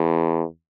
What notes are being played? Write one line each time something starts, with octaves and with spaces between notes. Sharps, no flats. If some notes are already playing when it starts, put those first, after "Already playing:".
Already playing: E2